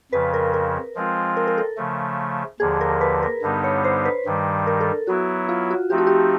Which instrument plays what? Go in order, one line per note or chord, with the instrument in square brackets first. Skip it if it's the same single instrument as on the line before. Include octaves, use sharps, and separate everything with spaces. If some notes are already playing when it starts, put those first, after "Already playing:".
[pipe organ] F2 C#3 F3 [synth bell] B4
[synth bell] A#4
A#4
[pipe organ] F3 G#3 C4 F4
[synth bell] A#4
A#4
A4
[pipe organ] C#3 F3 A3
[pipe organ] D#2 D3 F3 [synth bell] G#4
[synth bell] A#4
B4
A#4
[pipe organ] G2 D3 G3 B3 D#4
[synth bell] C#5
C5
B4
[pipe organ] G2 D#3 G3
[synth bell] A#4
A4
[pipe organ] F#3 B3 E4 [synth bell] F#4
[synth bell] F4
F#4
[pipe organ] F3 A3 C4 D#4 [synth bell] G4
[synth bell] F#4
G4